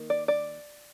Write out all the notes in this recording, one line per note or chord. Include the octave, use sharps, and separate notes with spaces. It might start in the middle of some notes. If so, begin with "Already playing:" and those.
Already playing: D#3 A#3
D5
D5